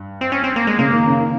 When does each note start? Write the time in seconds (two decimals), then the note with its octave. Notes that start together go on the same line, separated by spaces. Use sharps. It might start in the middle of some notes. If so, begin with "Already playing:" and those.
Already playing: G2
0.21 C4
0.32 C#4
0.44 C4
0.56 A#3
0.67 G#3
0.79 C#3 A#3
0.93 D#3
1.06 C#3
1.19 D#3